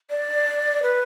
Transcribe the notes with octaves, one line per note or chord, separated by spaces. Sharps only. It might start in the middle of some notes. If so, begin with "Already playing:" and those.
D5
B4